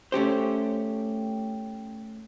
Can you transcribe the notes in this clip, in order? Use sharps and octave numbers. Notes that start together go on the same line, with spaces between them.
A3 C#4 G4 C5